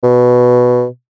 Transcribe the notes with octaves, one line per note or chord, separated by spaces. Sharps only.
B2